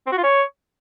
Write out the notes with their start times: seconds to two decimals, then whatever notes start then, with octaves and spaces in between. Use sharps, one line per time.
0.07 C4
0.12 F#4
0.18 F4
0.23 C#5